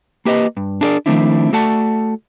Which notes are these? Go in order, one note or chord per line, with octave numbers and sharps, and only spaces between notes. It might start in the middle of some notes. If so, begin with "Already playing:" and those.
A#3 G4 B4 D#5
G2
D4 E4 G#4 A#4 D5
D#3 F3 A3 C4 D4 E4
A3 F#4 A4 D5 F#5 A5